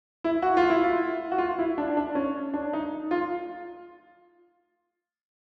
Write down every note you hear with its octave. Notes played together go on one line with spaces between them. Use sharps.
E4
F#4
F4
E4
F4
F#4
F4
E4
D4
D4
C#4
D4
D#4
F4